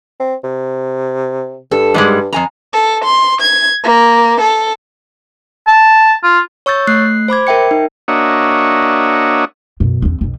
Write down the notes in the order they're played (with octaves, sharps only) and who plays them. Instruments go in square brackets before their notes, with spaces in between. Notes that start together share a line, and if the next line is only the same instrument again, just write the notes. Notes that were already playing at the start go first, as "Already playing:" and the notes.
[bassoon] C4
C3
[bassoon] G2 [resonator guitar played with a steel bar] A4
[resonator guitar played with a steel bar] G#2 G3 G#3
F2 G#5 A#5
[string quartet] A4
C6
G#6
A#3
A4
[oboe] A5
F4
[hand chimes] C#5 C#6 E6 G6 A6
A3 F#6 C7
C5 B5 D6 G#6
A#4 E5 G5 C#7
D#4
[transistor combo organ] A#3 D4 F#4 C#5 D#5 E5
[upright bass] F#2 B2
E2 C4
B1 F2